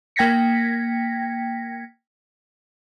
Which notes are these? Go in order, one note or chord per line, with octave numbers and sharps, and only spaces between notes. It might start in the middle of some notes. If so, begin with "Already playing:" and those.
A#3 G5 G#6 A#6 B6 C#7